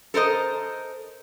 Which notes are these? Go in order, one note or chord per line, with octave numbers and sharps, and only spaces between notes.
A4 A#4 C5 D#5